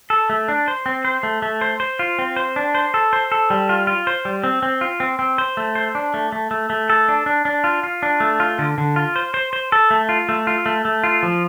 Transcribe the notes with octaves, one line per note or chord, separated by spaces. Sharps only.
A4
A3
D4
C5
C4
C5
A3
A3
C5
C5
F4
C4
C5
D4
C5
A4
C5
A4
G3
F4
F4
C5
G3
C4
C4
F4
C4
C4
C5
A3
C5
D4
A3
A3
A3
A3
A4
D4
D4
D4
F4
F4
D4
A3
F4
D3
D3
F4
C5
C5
C5
A4
A3
F4
A3
F4
A3
A3
F4
F3